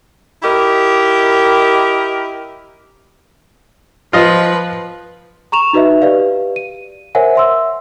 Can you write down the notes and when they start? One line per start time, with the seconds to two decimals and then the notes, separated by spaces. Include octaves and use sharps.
0.43 E4 G4 A#4 D#5
4.13 F3 F4 B4 D#5
5.52 A#5 C#6 E7 F7
5.73 D#4 F#4 B4 D#5 E5
6.02 G4 B4 D5 F5
6.56 D#7
7.15 A#4 C5 C#5 E5 F#5 G#5
7.36 E5 C6 E6